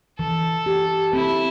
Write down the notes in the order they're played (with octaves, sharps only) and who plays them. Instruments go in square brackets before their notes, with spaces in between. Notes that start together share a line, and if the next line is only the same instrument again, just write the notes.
[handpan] E3 [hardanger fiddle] A4
[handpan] G4
[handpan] C4 [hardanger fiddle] E4